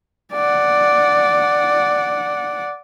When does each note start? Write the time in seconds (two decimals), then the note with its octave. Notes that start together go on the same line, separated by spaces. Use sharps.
0.33 D5 F#5